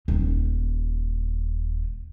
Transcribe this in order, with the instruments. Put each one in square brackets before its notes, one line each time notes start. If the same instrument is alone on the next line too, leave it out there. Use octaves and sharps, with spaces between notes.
[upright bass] D#1 D#4